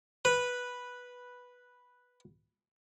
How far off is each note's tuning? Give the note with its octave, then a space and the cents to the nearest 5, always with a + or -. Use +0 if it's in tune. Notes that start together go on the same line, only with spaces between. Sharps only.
B4 -5